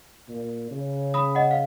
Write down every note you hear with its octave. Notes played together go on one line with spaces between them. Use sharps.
A#2
C#3
B5 D#6
D#5 F#5
F5